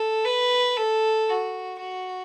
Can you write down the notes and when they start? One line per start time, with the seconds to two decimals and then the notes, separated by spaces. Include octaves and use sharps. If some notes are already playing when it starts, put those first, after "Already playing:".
Already playing: A4
0.25 B4
0.77 A4
1.29 F#4
1.81 F#4